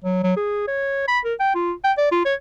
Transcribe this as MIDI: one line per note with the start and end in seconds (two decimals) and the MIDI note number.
0.04 0.20 54
0.24 0.33 54
0.36 0.63 68
0.68 1.06 73
1.08 1.20 83
1.25 1.34 70
1.40 1.52 79
1.55 1.72 65
1.84 1.92 79
1.98 2.10 74
2.12 2.20 65
2.25 2.35 73